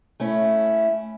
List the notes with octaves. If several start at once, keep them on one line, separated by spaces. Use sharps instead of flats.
A3 C#4 E4